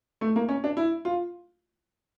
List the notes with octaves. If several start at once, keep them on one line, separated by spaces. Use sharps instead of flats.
A3
A#3
C#4
D4
E4
F4